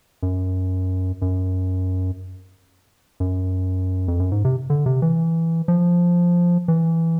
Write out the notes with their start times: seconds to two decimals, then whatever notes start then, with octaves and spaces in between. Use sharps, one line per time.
0.23 F#2
1.22 F#2
3.20 F#2
4.08 F2
4.20 F#2
4.32 G#2
4.45 C3
4.70 D3
4.86 C3
5.02 E3
5.68 F3
6.68 E3